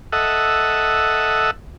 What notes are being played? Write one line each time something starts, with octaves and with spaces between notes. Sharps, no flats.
A4 D#5 E5 F#5